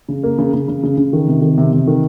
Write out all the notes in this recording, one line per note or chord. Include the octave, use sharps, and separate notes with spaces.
C#3
A#3
C#3
C#3
C#3
C#3
C#3
D#3
C3
D#3
C3
C3
D#3